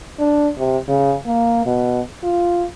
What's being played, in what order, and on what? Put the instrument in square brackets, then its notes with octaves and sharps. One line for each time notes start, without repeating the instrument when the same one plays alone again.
[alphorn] D4
C3
C#3
A#3
B2
F4